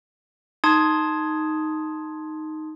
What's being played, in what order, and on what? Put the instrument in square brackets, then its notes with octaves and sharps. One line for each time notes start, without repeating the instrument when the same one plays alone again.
[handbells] D#4 A5 C6 D#6 G#6